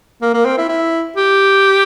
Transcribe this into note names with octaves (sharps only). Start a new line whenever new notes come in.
A#3
A#3
C4
E4
E4
G4